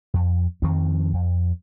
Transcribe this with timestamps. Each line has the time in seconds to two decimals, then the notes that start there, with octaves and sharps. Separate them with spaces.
0.14 F2
0.62 F2 D#3 F3 C4
1.13 F2